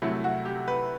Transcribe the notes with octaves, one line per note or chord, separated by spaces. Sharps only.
C2 C3 F#3 A3 E4
F#4
G4
B4